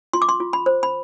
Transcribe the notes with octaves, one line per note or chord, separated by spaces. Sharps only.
F4 C6
D6
C6
F4
B5
C5
B5